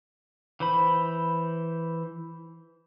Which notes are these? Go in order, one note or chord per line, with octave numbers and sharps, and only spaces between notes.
E3 C5 B5